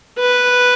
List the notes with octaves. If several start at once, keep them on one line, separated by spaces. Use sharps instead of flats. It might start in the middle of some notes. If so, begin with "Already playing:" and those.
B4